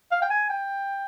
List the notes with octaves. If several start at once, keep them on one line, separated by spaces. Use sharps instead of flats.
F5
G5
G#5
G5